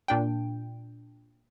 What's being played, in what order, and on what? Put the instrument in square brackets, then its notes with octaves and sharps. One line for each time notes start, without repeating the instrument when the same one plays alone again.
[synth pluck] A#2 D4 G5